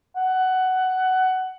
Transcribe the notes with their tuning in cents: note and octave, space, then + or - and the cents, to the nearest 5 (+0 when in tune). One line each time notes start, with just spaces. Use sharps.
F#5 +15